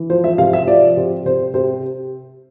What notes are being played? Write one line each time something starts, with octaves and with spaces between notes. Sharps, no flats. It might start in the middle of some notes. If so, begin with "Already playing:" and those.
Already playing: E3
F3 C5
E5
C3 F5
E5
F3 D5
C3
C3 C5
C3 C5